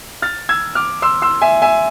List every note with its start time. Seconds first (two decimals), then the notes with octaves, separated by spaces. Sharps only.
0.22 F6 A6
0.49 E6 G#6
0.75 D6 F6
1.02 C6 E6
1.22 C6 E6
1.41 E5 G#5
1.62 E5 G#5